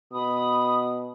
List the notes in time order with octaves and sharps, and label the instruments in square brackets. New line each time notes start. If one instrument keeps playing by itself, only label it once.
[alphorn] B2 [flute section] B5 D#6